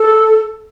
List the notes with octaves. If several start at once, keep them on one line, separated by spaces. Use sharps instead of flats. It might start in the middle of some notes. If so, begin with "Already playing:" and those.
Already playing: A4